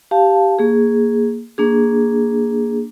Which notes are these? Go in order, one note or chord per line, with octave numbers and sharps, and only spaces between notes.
G4 F5 A5
A#3 G#4
A#3 D4 G#4